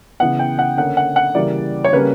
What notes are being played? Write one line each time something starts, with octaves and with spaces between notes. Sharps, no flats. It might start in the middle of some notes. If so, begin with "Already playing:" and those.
C#3 E3 B3 F#5
G5
F#5
D3 A#3 C#4 F#5
F#5
F#5
C#3 E3 G3 A#3 D5
C#5
C#3 G3 A#3 C#4 B4